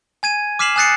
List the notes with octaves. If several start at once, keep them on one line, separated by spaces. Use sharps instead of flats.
G#5 G#6 D#7
D6 F6 B6 C7 E7 F#7
G#5 D#6 F#6 A6 C7 C#7